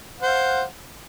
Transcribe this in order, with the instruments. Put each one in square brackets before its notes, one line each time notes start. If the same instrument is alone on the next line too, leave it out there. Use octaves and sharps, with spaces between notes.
[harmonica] F#5
C5
F5